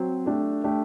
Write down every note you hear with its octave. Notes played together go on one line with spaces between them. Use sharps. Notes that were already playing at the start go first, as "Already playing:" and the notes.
Already playing: F#3 C4
A3 D4 G4
A3 D4 G4